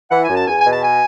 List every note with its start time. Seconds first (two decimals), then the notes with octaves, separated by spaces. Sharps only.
0.11 E3 F#5
0.23 G#5
0.29 F#2
0.35 A5
0.47 E2 G#5
0.59 G#5
0.65 B2
0.71 A5
0.83 G#5